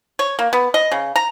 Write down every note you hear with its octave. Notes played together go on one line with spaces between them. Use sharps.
C#5
A#3
B3
D#5
C#3
A#5